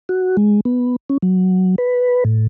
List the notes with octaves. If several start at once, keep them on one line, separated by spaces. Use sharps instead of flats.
F#4
G#3
B3
C#4
F#3
B4
A2